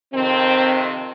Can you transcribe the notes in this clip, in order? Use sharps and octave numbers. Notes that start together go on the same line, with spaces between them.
F2 C3 D#3 C4